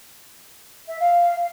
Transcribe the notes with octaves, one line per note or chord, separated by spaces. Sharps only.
E5
F5